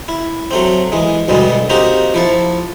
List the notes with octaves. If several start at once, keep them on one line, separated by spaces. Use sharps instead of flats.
E4
F#3 A3 C4
E3 G#3
D2 G2 B2 G3 G#3
A#3 C4 D#4 F#4 G4
F3 E4 A4